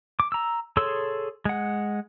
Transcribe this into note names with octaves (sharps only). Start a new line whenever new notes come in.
D6
A#5 E6
G#4 A4 C#5 C6 E6
G#3 F#5